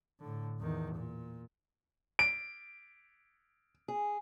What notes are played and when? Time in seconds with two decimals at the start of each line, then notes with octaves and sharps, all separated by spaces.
0.20 A2 D3
0.59 E2 D#3
0.95 A#2
2.19 D7
3.88 G#4